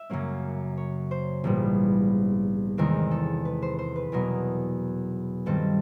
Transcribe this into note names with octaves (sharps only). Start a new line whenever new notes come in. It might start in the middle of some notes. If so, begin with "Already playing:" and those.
Already playing: E5
F#2 C#3 F#3 A#3 C#4
C#5
C5
A#1 G#2 E3 G3 B3
E2 C3 D#3 G#3 C4 A#4
A4
B4
C5
C5
B4
E2 B2 F#3 B3 A#4
G2 D#3 G3 C4 A4